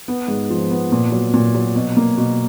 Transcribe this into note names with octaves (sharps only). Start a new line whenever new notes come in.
B3
G#2
F3
B3
A#2
F#3
A#2
F#3
B2
A#3
B2